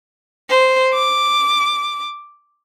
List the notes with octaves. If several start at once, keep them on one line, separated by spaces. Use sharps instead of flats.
C5
D6